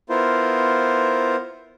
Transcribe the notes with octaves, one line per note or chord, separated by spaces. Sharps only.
B3 E4 F4 A#4 C5